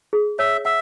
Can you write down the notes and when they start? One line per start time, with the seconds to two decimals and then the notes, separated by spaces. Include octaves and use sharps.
0.13 G#4
0.39 C#5 E5
0.65 E5 F#5